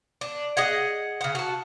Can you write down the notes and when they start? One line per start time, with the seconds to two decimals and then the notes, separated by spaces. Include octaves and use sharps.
0.21 D4
0.57 G#4 D#5 F#5
1.21 C#3 F#5
1.35 F#4 A5